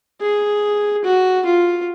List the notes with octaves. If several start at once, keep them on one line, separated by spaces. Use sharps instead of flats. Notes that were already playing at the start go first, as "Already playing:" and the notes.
G#4
F#4
F4